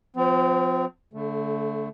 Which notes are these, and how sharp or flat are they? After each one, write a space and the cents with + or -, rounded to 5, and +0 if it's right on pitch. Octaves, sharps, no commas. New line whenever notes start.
F3 +20 C4 -35
D3 -35 A3 +0